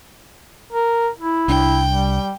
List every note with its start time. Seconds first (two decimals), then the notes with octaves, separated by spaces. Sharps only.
0.73 A#4
1.19 E4
1.48 C2 D4 G5
1.88 G3